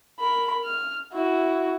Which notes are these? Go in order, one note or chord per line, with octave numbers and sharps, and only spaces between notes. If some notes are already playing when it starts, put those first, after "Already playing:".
A#4 B5
F6
E4 F#4